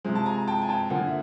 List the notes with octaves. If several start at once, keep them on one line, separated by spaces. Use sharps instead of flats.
C3 F3 G#3
A5
G#5 A#5
G5 A5
G#5
G5 A5
D3 F3 A#3 F#5 G#5
E5